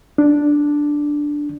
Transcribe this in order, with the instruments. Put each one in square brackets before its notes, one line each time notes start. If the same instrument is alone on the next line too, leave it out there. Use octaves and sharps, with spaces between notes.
[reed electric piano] D4